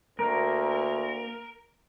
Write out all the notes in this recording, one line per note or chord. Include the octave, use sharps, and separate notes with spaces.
D2 A#3 A#4